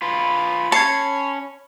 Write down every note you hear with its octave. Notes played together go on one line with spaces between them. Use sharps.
F4 B4 B5
C#4 C#5 A5 G#6 C7 C#7